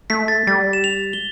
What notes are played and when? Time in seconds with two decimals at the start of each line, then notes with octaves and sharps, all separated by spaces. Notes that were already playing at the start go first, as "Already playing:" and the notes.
0.10 A3 B6
0.28 A6
0.47 G3 A6
0.73 E7
0.84 F7
1.13 G7